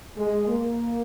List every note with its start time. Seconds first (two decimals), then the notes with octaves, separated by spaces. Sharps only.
0.17 G#3
0.47 A#3